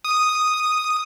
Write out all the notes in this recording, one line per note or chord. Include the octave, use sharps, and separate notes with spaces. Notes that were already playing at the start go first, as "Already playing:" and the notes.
D#6